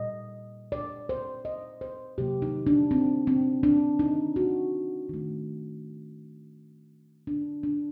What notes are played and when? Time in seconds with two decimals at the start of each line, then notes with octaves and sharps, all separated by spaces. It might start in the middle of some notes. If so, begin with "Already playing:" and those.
Already playing: A#2 G3 D#5
0.72 D5
1.09 C5
1.45 D#5
1.81 C5
2.18 C3 F#3 A#3 G4
2.42 D#4
2.67 D4
2.91 C4
3.27 C4
3.63 D4
3.99 D#4
4.36 F#4
5.09 D#3 A3
7.27 D4
7.63 D4